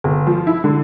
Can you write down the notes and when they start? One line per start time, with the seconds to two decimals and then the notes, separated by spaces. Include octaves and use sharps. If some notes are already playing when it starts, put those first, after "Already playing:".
0.04 G1
0.27 F3
0.47 E4
0.64 D3